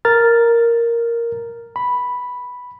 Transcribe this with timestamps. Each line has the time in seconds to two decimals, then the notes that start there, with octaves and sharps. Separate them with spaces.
0.05 A#4 A#5 F6 A6
1.76 B5